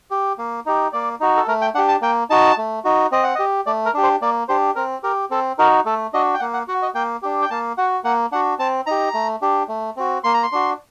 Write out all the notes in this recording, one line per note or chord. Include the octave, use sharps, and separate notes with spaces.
G4
A#3
D#4 G4
A#3 D5
D#4 F#4
A4
A3 A#4
G5
D4 G4 F#5
A5
A#3 G5
D#4 F#4 A5
A3
D#4 F#4
C4 D#5
F#5
G4 D#5
A3 D5
A#4
D4 G4
C5
A#3 D5
D4 G4 C5
C4 A#4
G4 A#4
C4 A4
D#4 F#4 A#4
A3 A4
D4 F#4 D#5
G5
A#3 F#5
F#5
F#4 F#5
D#5
A#3 G5
D4 G4
G5
A#3 A5
F#4 F#5
A#3 F#5
D4 F#4 F#5
C4 A5
D#4 G4 A#5
A3
D4 G4
A3
C4 F#4
A#3 C6
A#5
C6
D4 F#4